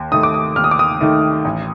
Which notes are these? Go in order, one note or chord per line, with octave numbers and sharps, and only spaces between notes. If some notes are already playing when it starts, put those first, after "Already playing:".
Already playing: D#2
D#3 A3 D#4 D#6
D6
D#6
D#2 F6
D#6
D6
D#6
D#3 A3 D#4
A1